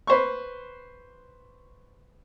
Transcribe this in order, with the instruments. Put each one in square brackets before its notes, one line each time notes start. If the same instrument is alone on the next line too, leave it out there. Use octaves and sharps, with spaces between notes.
[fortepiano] B4 C5 C#6